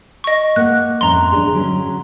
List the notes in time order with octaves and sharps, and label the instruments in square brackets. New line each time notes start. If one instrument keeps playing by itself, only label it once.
[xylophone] D#5 C#6
[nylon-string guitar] A#3 A#4 F#5 [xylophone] F#6
[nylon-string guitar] F2 A2 C#4 [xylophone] A#5 C6
[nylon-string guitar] E2 D4 G#4
D3 F#3 C#4